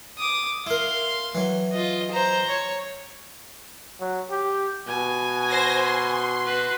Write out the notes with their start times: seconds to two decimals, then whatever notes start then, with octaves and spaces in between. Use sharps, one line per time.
0.19 D6 D#6
0.67 E4 A#4 F5 C6
1.35 E3 F#3
1.72 F4 D#5
2.11 C5 A#5
2.49 C#5
4.00 F#3
4.31 G4
4.88 B2 G#5
5.48 C5 A#6
5.82 C6
6.46 F#4 B4